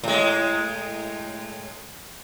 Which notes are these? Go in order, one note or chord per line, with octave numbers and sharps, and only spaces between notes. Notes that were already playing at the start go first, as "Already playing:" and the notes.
A2 G#3